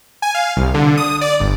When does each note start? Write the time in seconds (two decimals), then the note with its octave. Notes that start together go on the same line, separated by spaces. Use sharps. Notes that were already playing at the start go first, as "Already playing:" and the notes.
0.22 G#5
0.34 F5
0.57 C2
0.74 D3
0.97 D#6
1.21 D5
1.40 G1